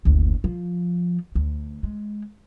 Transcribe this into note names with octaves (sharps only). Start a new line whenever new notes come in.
F#1 D2
F3
D2
G#3